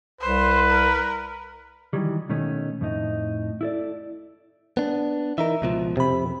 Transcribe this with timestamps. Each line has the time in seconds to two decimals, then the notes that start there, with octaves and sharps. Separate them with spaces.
0.21 C2 B4 C5
0.69 A#4
1.93 D#3 E3 F#3 G3
2.29 B2 D#3 A3 C#4
2.81 F2 A2 D#4
3.61 E4 A4 D5
4.77 B3 D4
5.38 E3 D#4 A#4 E5
5.62 C#2 B2 F3
5.97 F2 C3 B5